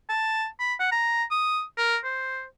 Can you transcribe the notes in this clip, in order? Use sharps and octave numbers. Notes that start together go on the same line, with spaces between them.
A5
B5
F#5
A#5
D#6
A#4
C5